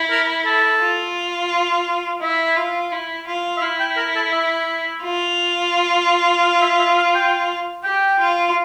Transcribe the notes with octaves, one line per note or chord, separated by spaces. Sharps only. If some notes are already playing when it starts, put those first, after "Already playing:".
Already playing: E4
A#4
A4
F4
E4 E5
F4
E4
F4
E5
E4 F5
G5
A#4
A4
E5
F4
F5
E5
E5
F5
G5
G4 G5
F4